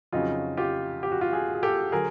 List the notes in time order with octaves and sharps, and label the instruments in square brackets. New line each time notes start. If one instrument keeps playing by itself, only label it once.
[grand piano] F2 C#3 F#3 D#4 F4
F4 G4
G4
F#4
F4 G4
F#4 G#4
G#4
G4 A4
D3 F#3 G#4 A#4